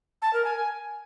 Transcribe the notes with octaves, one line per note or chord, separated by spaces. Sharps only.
A5
A#4
G#5